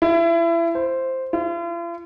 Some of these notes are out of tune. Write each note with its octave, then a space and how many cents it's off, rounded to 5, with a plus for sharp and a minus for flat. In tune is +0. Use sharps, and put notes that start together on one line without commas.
E4 +30
C5 +0
F4 -45